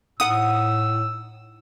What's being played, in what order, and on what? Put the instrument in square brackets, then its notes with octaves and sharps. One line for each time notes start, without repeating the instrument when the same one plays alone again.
[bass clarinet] A2 [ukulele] D#4 F#5 [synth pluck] D#6 [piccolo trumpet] E6